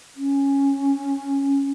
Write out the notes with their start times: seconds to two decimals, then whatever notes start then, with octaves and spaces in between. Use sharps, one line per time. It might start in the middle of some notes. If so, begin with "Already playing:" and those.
0.17 C#4